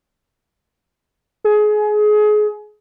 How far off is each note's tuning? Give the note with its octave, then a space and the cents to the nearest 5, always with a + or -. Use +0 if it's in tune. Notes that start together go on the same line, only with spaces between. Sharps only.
G#4 +25